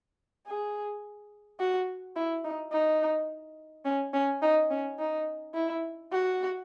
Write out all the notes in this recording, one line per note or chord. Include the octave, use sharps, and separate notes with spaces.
G#4
F#4
E4
D#4
D#4
C#4
C#4
D#4
C#4
D#4
E4
F#4